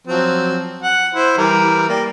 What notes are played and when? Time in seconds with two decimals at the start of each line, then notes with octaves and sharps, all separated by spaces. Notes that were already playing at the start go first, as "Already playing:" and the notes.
0.07 F3 F#3 C4
0.82 F#5
1.14 E4 C5
1.38 E3 G3 A#4
1.89 A#3 G4 D5